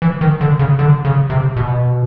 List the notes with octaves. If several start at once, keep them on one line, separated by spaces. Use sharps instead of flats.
E3
D#3
D3
C#3
D3
C#3
C3
B2